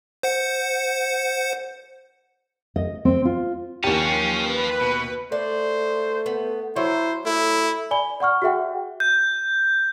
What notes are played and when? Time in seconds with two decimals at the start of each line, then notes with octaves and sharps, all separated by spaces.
0.23 C5 F#5 C#7
2.76 D#5
3.05 C4
3.25 F4
3.84 D#2 C#4 F4 G4 A5
4.39 B4
4.81 B2
5.32 A3 C5 D5
6.26 B3
6.76 F#3 E4 C5
7.26 A3 E4
7.91 D5 G#5 B5 G7
8.20 D5 F#5 C#6 F6
8.42 F#4 G#4 E5 F#5 G5
9.00 G6